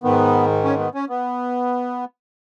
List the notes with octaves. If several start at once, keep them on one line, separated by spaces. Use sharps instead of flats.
G#2 D#3 B3
C#4
B3
C#4
B3